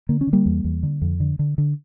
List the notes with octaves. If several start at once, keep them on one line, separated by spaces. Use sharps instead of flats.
D3 A#3
C#4
D3
G3 A#3
E2
E2
D3
F2
D3
D3
D3